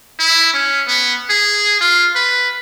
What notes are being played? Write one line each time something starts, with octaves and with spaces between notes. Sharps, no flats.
E4
C#4
B3
G#4
F4
B4